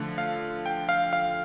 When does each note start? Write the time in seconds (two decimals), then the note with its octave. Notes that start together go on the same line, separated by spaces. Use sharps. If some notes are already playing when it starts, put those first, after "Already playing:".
Already playing: D3 F3 A3
0.18 F5
0.66 G5
0.89 F5
1.13 F5